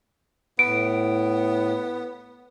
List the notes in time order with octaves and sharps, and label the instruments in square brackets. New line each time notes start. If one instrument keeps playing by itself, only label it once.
[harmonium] A2 [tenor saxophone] B3 [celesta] D7